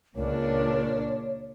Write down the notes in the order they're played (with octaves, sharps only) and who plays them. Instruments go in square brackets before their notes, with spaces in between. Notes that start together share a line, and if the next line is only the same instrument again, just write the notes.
[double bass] C#2 [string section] A#2 D4 [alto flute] A#4 [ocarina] C#5